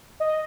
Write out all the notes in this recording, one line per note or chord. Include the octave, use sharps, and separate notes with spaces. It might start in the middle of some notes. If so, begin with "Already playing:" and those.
D#5